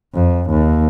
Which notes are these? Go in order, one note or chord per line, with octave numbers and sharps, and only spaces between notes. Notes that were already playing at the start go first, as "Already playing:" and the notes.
F2
D#2